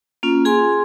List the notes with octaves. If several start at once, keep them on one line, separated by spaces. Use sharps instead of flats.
A#3 C#4 F4
G#4 G#5 C6